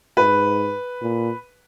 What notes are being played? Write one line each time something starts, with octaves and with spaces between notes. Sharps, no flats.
G#2 B4
A#2